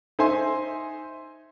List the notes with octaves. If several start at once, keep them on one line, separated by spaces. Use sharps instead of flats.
D#4 C5 E5 G#5 C6